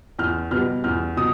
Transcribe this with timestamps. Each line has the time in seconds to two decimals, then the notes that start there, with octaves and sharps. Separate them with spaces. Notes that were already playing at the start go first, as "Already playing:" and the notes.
0.19 E2 F6
0.51 B2 G3 B3 F6
0.84 E2 F6
1.17 B2 D#6